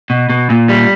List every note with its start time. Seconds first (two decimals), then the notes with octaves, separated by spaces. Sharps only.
0.10 B2
0.30 B2
0.50 A#2
0.69 G3